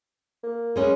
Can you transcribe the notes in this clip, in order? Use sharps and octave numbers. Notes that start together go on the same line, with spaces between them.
A#3
G3 G#3 C#4